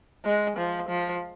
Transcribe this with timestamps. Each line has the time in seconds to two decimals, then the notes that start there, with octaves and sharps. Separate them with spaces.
0.25 G#3
0.57 F3
0.89 F3